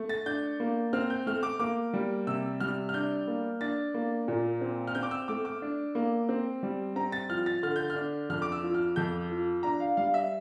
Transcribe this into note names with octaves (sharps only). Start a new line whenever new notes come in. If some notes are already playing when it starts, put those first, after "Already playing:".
Already playing: A3
A6
D4 G6
A#3
C4 F6
G6
A3 F6
D6
A#3 D6
G3
C3 E6
G3 F6
F6
D4 G6
A#3
D4 A6
A#3
A#2
C4
F6
C4 G6
D6
E6
A3 D6
D6
D4
A#3
C4
G3
C4 A#5
A6
F3 F6
A6
D3 F6
G6
F6
D4
F2 F6
D6
E6
F3
F6
F2 G6
F3
D4 A#5
F5
G3 F5
E5